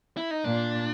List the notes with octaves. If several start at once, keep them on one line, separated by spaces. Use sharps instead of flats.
E4
D#4
A#2 D4